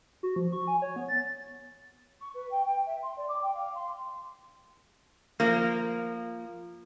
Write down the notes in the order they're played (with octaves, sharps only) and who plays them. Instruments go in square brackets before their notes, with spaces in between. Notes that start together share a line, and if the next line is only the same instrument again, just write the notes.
[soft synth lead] F#4
F3
C#6
G#5
C#5
B3
A6
[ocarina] C#6
B4
G5
G5
E5
C6
D5
D6
G5
F5
C6
[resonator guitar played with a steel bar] F3 A#3